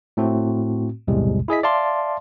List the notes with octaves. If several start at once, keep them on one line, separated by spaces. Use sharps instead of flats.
A2 A3 C4 F#4
B1 E2 A2 C3 G3 G#3
E4 G#4 D#5 B6
D5 E5 F5 A5 C6